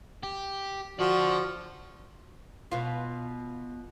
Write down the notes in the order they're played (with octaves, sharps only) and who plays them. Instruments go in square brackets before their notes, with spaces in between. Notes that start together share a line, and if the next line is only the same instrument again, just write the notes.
[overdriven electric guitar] G4
[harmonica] F3 [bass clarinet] F#4 [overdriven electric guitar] A4 D5
[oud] B2 F4